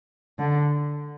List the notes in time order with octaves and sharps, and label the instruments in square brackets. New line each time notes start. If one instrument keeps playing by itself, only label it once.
[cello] D3